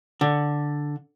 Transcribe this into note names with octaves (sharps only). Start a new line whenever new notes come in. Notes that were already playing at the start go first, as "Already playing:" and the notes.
D3